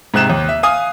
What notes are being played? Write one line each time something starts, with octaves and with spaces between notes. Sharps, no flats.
G#2 C3 F#6 E7
D#2
E5
F5 G#5 D#6